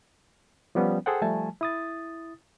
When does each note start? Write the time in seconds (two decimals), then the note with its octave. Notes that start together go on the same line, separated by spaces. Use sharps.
0.75 F3 G3 B3 C#4
1.06 G#4 A4 C5 F#5 G5
1.22 F3 G3 A3 G#5 A5
1.61 E4 D#6 A6